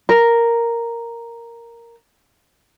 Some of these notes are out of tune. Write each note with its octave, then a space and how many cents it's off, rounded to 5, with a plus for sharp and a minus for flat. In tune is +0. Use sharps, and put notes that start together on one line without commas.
A#4 +0